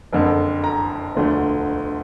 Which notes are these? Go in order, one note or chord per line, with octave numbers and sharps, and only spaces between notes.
F#1 F2 D3
A#5
E1 D2 D3 F3 A3